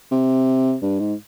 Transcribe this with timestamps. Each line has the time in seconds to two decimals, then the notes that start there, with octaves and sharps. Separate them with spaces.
0.11 C3
0.82 G2
1.00 G#2